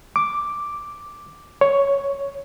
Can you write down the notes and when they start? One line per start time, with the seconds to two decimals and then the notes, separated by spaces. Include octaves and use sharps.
0.16 D6
1.61 C#5